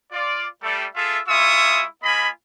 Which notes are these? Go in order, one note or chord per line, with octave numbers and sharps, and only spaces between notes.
F4 D5
G3 A3 A4
F4 G#4 A4 E5
G#3 E4 F4 E5 C#6 D#6
A#3 F4 D#5 G#5 B5